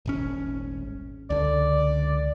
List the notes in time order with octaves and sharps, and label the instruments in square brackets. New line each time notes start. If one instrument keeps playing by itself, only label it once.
[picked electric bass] D#1 G#1 C#4
[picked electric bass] C#2 D3 [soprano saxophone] D5